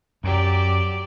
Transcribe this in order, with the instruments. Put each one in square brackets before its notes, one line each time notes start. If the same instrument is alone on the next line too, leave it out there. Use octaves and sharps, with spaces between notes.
[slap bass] F#2 [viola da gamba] F#3 G4 D5